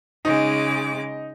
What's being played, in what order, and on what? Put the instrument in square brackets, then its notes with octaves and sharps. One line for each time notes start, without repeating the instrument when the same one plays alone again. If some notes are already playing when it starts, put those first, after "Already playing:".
[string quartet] C#3 G#3 D6 [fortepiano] D#4